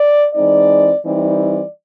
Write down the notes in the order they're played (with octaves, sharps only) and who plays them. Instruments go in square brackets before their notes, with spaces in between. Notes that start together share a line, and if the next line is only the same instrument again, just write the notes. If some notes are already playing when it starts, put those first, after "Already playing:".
Already playing: [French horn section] D5
E3 G#3 C4 D#4 D5
E3 G3 C4 D#4 D5